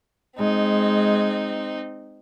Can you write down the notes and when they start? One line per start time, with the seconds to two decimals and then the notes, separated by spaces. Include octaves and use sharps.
0.38 G#3 C4 D#4